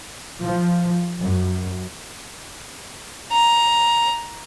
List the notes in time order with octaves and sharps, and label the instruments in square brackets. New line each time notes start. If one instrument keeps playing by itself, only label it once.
[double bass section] F3
F#2
[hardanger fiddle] A#5